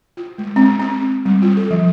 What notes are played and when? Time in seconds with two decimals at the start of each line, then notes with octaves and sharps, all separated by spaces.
0.17 F4
0.38 G#3
0.56 C4
0.80 C4
1.25 G3
1.42 F4
1.57 A4
1.70 F3